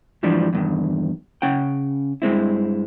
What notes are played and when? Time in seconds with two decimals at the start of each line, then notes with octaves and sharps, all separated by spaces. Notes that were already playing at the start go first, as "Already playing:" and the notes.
0.23 G#2 E3 F3 G3 D4
0.53 E2 G2 D#3
1.42 C#3 C#4 F#5 G5
2.22 G2 G#3 C4 E4